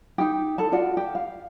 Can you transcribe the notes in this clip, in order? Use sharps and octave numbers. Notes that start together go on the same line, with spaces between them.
D#4 G4
A4 A5
F4 F#4 D5 F#5
G4
F5